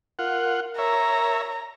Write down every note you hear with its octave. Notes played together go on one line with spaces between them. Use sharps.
F4 A#4 F#5
C#5 E5 A#5